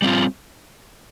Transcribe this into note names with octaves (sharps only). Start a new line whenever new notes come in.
G3 C4 F4